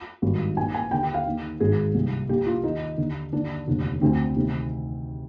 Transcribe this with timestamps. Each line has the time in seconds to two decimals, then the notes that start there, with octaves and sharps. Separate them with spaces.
0.22 G#1 G2 D#3
0.57 A#1 A#2 G#5
0.74 G#5
0.91 D#2 D3 G5
1.03 G5
1.14 F5
1.26 D#2 D#3
1.60 G#1 G#2 D#3 G#4
1.94 C2 A#2
2.29 A#1 A#2 G4
2.47 F4
2.63 D#2 D#3 D#4
2.98 D#2 D3
3.32 D#2 D3 D4
3.67 F1 D#2 D3
4.01 D2 D3 C4
4.36 D2 C3 D#3